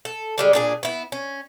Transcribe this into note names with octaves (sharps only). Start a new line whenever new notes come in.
A4
D3 G3 G#3
A#2 D4 G#4
B3 E4
C#4